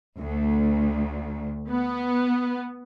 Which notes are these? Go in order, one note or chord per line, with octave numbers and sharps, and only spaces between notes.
D2
B3